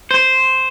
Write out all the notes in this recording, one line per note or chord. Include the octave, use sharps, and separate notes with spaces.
C5